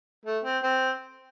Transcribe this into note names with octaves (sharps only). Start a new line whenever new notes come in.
A3
C4
C4